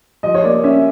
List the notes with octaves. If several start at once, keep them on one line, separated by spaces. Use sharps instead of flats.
F3 D#5
C#5
A#3 D5
C#4 E5